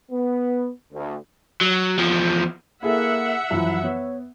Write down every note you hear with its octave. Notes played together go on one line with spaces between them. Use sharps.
B3
D2
F#3
E2 F3
A#3 E4 G#4 A4 E5 F#5
F#2 E3 F3 E4
B3 C#5